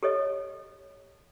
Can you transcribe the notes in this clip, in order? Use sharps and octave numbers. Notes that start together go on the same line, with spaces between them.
G4 A4 C#5 D#5